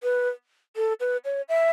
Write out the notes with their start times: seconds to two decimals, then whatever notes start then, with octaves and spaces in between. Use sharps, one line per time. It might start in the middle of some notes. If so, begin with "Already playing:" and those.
0.03 B4
0.76 A4
1.00 B4
1.25 C#5
1.49 E5